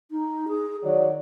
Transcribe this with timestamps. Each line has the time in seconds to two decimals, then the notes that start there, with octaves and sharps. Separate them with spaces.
0.11 D#4
0.48 G#4
0.83 D#3 F#3 D5